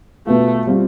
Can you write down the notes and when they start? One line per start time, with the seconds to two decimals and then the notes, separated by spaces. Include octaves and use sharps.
0.26 B2 A3 B3 F4
0.67 G3 C4 F4